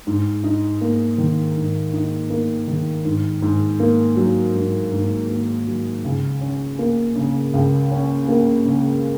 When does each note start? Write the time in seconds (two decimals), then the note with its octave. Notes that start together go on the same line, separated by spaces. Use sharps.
0.07 G#2
0.44 D#4
0.81 A#3
1.18 D#3
1.56 G#2
1.93 D#4
2.30 A#3
2.68 D#3
3.05 G#2
3.42 G#2
3.80 A#3
4.17 F#3
4.55 G#2
4.92 G#2
5.30 A#3
5.67 F#3
6.04 C#2
6.41 C#4
6.79 A#3
7.15 C#3
7.53 C#2
7.91 C#4
8.28 A#3
8.65 C#3